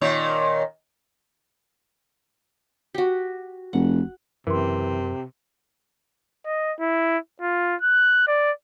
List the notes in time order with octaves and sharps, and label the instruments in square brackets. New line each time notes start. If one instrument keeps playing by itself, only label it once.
[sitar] A#2 D#3 C#5
[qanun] F#4 G4
[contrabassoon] F1 [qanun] F#5
[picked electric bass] F#1 F#2 C#4 [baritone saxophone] C3 [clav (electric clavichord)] E3 [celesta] A#4 C6
[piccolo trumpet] D#5
E4
F4
F#6
D5